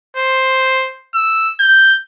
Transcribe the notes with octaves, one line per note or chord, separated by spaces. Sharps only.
C5
E6
G6